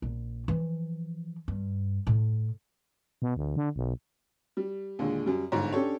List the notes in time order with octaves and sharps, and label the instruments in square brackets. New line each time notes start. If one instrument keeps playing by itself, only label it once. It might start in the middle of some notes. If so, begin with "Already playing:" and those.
[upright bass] A#1
E3 F3
G2
A2
[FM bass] B2
D2
D3
B1
[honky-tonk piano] G3
D#2 A#2 D3 G#3
F#2 G3
G1 G#2
C#4 D4 G4 A4 C#5